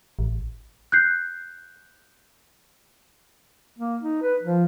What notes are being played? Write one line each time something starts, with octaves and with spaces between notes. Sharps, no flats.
A1
F#6 G6 C7
A#3
D#4
B4
F3